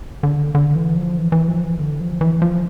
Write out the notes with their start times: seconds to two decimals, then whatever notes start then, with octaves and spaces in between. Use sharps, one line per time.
0.23 D3
0.55 D3
0.75 E3
0.96 F3
1.17 E3
1.32 E3
1.48 F3
1.63 E3
1.79 D3
2.00 F3
2.21 E3
2.42 F3